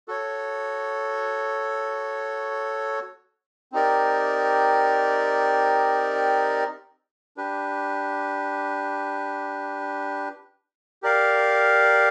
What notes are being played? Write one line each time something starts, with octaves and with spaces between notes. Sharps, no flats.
F#4 A4 C#5
C4 D#4 G4 A#4 D5
D4 G4 B4
G4 A#4 D5 F5